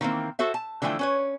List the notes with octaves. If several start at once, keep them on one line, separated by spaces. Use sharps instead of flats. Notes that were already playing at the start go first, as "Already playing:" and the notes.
D#3 E3 A#3 C4
F#4 A4 C5 E5
A5
D3 E3 F3 A3 E4 G5
C#4 B4 C#5